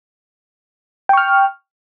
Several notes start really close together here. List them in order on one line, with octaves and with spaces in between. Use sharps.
G5 C#6 F6